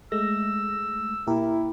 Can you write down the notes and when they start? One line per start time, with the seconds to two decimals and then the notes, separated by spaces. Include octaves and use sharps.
0.12 G#3 A3 E6 A#6
1.27 A#2 E4 G4 A#4